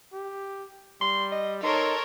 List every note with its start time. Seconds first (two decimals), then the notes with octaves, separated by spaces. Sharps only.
0.13 G4
1.01 G3 C6
1.32 D#5
1.63 D#4 A4 A#4 C#5 C6